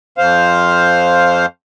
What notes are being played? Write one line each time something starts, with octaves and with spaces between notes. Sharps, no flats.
F2 C5 F5